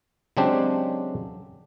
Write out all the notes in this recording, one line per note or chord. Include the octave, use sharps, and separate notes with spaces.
C#3 F#3 G#3 C4 D4 G4